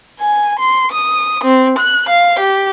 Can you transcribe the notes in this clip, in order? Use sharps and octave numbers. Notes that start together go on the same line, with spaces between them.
G#5
C6
D#6
C4
F#6
F5
G4